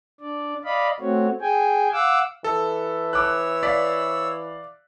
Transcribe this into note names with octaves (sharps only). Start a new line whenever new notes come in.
D4 D5
D5 D#5 F5 B5
A3 C4 F#4 C#5
G#4 G5 G#5
F5 F#5 D6 E6
E3 A4
C#5 D6 E6 F#6
D5 F5 B6